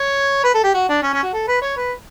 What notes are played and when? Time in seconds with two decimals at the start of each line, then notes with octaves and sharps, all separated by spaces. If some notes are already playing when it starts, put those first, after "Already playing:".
Already playing: C#5
0.44 B4
0.54 A4
0.64 G4
0.74 F#4
0.89 D4
1.03 C#4
1.13 C#4
1.23 F#4
1.33 A4
1.48 B4
1.62 C#5
1.77 B4